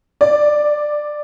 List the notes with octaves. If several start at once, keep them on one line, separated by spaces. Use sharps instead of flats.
D5